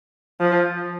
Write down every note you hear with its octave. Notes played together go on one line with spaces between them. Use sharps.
F3